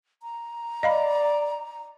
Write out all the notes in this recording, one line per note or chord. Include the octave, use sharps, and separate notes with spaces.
A#5
D5 D#5 F5 B5